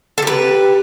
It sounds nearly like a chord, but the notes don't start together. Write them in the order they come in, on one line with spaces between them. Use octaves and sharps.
A4 G4 B4